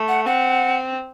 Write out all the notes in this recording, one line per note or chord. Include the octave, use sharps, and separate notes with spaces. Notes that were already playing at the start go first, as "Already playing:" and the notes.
Already playing: A3
F#5
C4 F#5